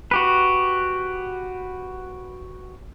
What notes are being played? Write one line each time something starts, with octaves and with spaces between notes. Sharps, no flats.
F#4 G4 B4